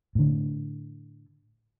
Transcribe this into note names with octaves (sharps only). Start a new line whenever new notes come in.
A2 D3